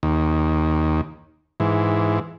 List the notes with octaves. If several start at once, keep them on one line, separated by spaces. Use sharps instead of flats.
D#2
G#2 E3